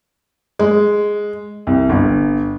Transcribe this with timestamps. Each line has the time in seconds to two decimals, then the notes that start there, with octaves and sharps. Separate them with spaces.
0.59 G#3
1.67 C2
1.89 G1